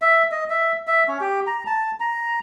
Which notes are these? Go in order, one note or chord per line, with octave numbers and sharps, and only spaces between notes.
E5
D#5
E5
E5
C#4
G4
A#5
A5
A#5